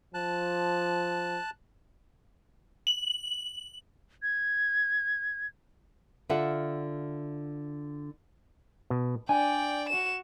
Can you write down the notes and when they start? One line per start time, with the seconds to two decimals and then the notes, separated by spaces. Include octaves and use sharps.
0.14 F3 A5 F#6
2.87 F#7
4.22 G#6
6.29 D3 F4 E5 F#5
8.90 B2
9.29 D4 D5 G5 G#5
9.89 F#4 E7